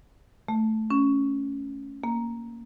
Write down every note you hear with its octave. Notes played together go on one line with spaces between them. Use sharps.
A3
C#4
A#3